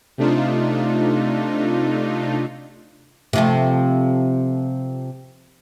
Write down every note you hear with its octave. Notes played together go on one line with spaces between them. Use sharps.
C3 A3 D4 D#4 F4
C3 F3 A3